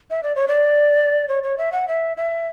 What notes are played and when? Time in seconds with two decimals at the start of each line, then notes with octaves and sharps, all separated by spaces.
0.10 E5
0.23 D5
0.36 C#5
0.48 D5
1.28 C#5
1.43 C#5
1.58 E5
1.72 F#5
1.88 E5
2.17 E5